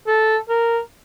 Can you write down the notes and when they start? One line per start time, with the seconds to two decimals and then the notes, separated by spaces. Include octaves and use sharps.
0.07 A4
0.49 A#4